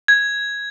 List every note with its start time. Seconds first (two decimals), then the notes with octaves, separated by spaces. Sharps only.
0.08 G#6